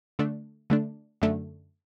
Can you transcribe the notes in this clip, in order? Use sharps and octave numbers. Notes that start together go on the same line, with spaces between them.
D3 A3 D4
D3 A3 D4
F#2 D3 A3